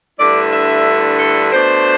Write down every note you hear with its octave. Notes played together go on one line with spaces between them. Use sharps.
G2 D3 A3 E4 D5
E5
A4
B2 A3 D4 C5